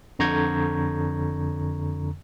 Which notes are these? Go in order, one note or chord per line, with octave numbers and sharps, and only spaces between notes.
F2 D3 A#5 C#6 G6 G#6